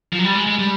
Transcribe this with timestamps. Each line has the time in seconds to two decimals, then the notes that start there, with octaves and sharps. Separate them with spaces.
0.13 F3
0.19 F#3
0.25 G3
0.35 G#3
0.47 G#3
0.59 G3